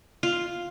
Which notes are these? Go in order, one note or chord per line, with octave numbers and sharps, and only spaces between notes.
F4